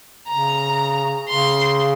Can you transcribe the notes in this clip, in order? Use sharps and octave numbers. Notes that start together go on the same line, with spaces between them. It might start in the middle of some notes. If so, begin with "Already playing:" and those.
C#3 A#5
C#3 C6